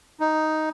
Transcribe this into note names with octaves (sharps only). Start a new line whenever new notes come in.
D#4